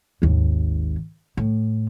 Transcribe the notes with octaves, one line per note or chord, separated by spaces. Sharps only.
G#1 D#2
A2